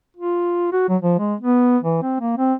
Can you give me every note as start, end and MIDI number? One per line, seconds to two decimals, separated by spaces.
0.17 0.68 65
0.72 0.85 66
0.89 0.97 54
1.02 1.16 53
1.19 1.35 56
1.40 1.78 59
1.83 1.99 52
2.02 2.16 60
2.20 2.36 58
2.38 2.54 60